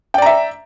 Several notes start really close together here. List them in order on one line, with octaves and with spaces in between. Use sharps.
G5 D5 A#5 E5